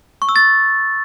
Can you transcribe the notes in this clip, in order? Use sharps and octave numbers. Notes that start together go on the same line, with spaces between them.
C#6
E6
A6